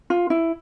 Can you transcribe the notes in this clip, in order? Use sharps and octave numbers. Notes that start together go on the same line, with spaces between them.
F4
E4